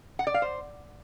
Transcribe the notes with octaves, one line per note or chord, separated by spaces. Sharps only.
F#5
D5
F5
C5